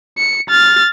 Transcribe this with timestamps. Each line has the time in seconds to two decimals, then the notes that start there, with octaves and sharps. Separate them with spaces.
0.18 C#7
0.50 F6 A6